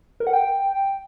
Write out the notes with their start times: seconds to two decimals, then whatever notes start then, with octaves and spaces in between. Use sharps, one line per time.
0.20 A#4
0.27 F#5
0.33 G5